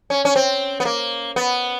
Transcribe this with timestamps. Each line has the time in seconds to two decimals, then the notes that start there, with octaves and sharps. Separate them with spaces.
0.10 C#4
0.25 C#4
0.36 C4
0.80 B3
0.85 A#3
1.36 B3